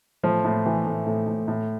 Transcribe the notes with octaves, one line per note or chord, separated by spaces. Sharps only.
A2 F3
A2
E3
A2
A2
A2
A2